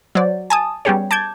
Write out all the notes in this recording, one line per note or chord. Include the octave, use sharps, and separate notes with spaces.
F#3 C5 D5
G#5 A5 D#6
G3 B3 C#4 G4 G#4 C#5
A5 D6 G6 G#6